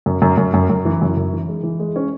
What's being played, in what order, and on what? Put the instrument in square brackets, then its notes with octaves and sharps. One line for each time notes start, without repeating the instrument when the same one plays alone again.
[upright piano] F#2
F#2
F#2
F#2
F#2
E3
F#2
F#2
E3
G#3
E3
G#3
C#4